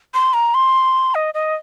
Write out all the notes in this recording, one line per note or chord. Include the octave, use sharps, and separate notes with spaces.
C6
A#5
C6
D#5
D#5